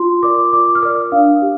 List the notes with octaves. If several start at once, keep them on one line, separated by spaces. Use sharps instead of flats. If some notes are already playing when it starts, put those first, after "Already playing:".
Already playing: F4 C6
A#4 D5 D6
F4 D6
F6
A#4 D5 D#6
D4 F5
G4